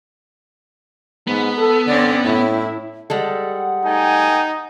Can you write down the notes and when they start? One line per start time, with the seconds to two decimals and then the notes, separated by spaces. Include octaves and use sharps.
1.27 G#2 B3
1.58 A4
1.87 D3 C4 C#4 D5
2.25 A2 E4
3.10 G3 G#3 A4 F#5
3.85 A3 D#4 G5 G#5